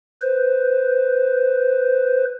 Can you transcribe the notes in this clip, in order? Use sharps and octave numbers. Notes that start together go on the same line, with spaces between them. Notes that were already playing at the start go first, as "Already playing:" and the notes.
B4 C5